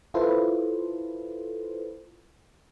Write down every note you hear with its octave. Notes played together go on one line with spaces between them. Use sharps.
E4 F4 A4 B4 C5